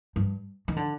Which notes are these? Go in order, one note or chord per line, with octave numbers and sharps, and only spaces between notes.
G2
D#3
D3